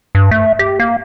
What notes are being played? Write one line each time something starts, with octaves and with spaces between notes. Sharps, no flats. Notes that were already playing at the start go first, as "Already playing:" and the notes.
G2
A3
G4
A#3